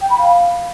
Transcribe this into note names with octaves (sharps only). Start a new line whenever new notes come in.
G5
B5
F5